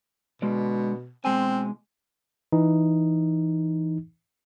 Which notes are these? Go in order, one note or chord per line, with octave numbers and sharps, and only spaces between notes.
B2 D3 G#3 D5
B2 G#3 C4 G#5
E3 D#4